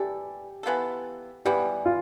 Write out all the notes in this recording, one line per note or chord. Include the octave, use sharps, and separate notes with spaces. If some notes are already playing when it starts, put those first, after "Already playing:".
Already playing: E3 A3 D4 G4 A4
E3 B3 F4 A4
E3 G3 B3 G4
F4